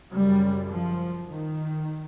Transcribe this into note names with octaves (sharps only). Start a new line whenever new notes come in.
F#2 C#3 G3
F3
D#3